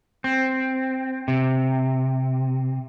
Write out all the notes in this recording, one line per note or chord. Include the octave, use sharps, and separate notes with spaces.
C4
C3